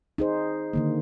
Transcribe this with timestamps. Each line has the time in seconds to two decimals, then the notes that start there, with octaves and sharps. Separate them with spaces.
0.18 D#4 G#4 C5
0.73 D3 D#3 A#3